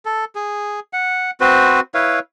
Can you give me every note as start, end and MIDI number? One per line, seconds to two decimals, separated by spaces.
0.05 0.25 69
0.35 0.80 68
0.93 1.31 78
1.40 1.80 60
1.40 1.80 66
1.40 1.80 71
1.40 1.80 72
1.94 2.19 64
1.94 2.19 71
1.94 2.19 73
1.94 2.19 77